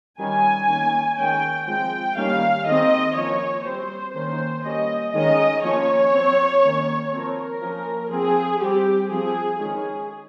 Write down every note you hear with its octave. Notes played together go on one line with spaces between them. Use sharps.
D#3 G3 C#4 G#5
D#3 A#3 C#4
D#3 G#3 C#4 G5
F3 G#3 C4 G5
D#3 G3 A#3 C#4 F5
D#3 G#3 C4 D#5
F3 A#3 C#4 C#5
G3 C4 C5
D#3 A#3 C#4 C5
G3 A#3 C#4 D#5
D#3 G#3 C#4 D#5
F3 A#3 C#4 C#5
F3 C4
D#3 A#3 C#4
F3 C4 A#4
F3 A#3 C#4
F3 C4 G#4
G3 C4 G4
F3 C4 G#4
D#3 G#3 C#4 G#4